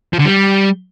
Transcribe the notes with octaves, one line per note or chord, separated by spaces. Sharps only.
F3
D3
G3